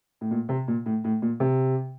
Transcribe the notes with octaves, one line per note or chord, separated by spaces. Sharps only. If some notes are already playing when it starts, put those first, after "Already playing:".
A2
A#2
C3
A#2
A2
A2
A#2
C3